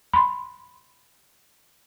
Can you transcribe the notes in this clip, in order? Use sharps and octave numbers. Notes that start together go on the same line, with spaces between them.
B5 C6